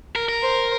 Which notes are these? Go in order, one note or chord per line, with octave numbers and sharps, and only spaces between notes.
A#4
A#4
C5